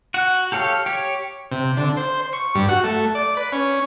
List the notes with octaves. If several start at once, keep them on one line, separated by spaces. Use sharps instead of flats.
F#4 F#5
G4 A4 C#5 F5
G4 C#5
C3
D3
C5
C#6
G2
F#4
A3
D5
B4
C#4